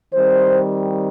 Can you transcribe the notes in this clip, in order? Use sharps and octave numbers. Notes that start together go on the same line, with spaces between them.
D#3 G3 C4 C5